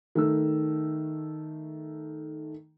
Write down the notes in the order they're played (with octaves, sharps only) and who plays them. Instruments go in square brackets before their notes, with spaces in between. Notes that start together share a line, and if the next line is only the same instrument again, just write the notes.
[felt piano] D#3 A3 E6